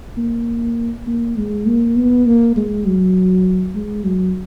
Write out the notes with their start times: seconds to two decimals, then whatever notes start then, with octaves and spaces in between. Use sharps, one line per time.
0.17 A#3
1.07 A#3
1.37 G#3
1.66 A#3
1.96 B3
2.26 A#3
2.56 G#3
2.86 F#3
3.75 G#3
4.05 F#3